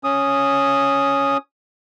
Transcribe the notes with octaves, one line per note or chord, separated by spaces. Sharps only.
C#4 D#6